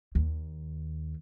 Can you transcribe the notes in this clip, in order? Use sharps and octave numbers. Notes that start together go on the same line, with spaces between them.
D#2